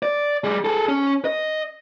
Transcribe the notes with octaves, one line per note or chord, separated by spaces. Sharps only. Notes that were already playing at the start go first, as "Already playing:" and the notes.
D5
G3 G#4
G#4 A4
C#4
D#5